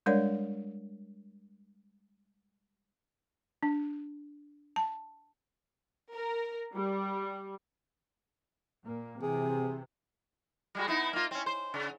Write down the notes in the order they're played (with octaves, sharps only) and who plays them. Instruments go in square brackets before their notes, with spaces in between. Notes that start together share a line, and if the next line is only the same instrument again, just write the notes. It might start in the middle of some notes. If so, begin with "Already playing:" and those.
[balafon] G3 G#3 D4 A#4 C#5 D5
D4
A5
[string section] A#4
G3
[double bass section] A#2 A#3
[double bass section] C3 E3 [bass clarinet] G#4
[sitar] G3 G#3 F#4
B3 D#4 E4
A#3 F4
C4 C#4
C5
C#3